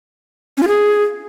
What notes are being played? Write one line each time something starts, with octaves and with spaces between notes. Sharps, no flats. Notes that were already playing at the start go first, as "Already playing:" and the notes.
C#4
F4
G#4